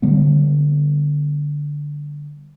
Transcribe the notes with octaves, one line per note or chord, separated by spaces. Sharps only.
D3 G3 B3